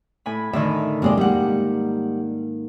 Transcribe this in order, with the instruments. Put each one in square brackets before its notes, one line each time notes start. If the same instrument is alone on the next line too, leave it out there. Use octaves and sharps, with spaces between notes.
[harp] A2 G#5 B5
[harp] A2 D3 D#3 [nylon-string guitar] E5
[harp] G#2 A#3 [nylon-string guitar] C3 G#3 D5
[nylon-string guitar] G3 F#5